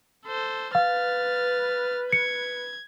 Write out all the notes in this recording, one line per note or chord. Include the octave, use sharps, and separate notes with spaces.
A4 C5
B4 F5 F6 A6
G#6 C#7